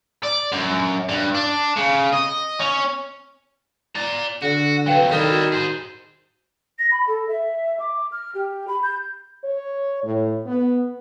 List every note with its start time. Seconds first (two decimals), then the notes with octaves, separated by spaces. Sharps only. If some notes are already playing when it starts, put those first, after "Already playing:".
0.23 D5
0.52 F#2
1.09 G2
1.35 D4
1.76 C#3
2.12 D#5
2.60 C#4
3.95 D5 A#5 A6
4.42 D3 F#4
4.86 C3 F#3 B4 F5 G5
5.11 D#3 G3 E4 A4
5.29 F#4
5.52 G#4 C5
6.79 A#6
6.91 B5
7.07 A4
7.29 E5
7.80 D6
8.12 F6
8.35 G4
8.68 B5
8.83 G6
9.44 C#5
10.04 A2
10.46 B3